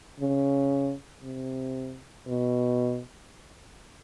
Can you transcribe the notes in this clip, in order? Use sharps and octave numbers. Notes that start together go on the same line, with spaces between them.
C#3
C3
B2